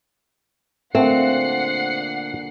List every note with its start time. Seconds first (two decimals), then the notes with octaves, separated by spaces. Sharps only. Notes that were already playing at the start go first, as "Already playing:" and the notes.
0.95 A#2 D3 A3 C4 F#5 C7